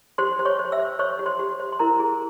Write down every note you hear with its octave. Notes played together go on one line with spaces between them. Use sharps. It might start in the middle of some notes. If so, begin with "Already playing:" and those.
G4 C5 C6
C5
C#5 C#6
C5
E5 E6
C5
C5 C#5 C#6
G4
C5 C6
G4
C5
C6
E4 A#4 A#5
G#4